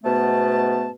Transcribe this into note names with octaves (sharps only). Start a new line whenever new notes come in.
G#2 B2 A3 B3 A5